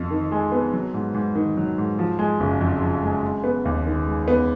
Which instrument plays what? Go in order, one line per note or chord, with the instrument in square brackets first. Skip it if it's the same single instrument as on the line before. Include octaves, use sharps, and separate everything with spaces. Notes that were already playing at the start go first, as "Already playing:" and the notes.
Already playing: [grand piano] F2
D#3
G#3
B3
F#3
G#2
G#2
D#3
F#3
G#2
F3
G#3
F#1
F2
F3
G#3
G#3
B3
D#2
D#3
G#3
B3